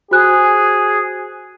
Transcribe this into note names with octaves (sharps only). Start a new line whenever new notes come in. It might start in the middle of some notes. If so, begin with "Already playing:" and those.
F#4 G#4 C5 F#6